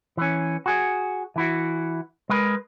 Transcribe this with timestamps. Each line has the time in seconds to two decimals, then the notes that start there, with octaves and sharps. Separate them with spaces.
0.17 E3 C#4
0.66 F#4 G#4
1.36 E3 E4 F#4
2.29 G#3 A#4 B4